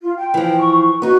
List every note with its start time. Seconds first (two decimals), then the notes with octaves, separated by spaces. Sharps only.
0.03 F4
0.17 G5
0.34 E3 F3
0.58 C#6
1.02 B3 D#4 F#4